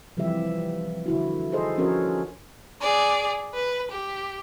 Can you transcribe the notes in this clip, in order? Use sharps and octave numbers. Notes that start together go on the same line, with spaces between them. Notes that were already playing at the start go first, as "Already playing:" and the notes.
C3 E3 F3 G3 G4 E5
D3 E4 F#4
G#4 A4 C5 D#5
F3 C#4 D4 F#4 A#4 C#5
G#4 D5
B4
G4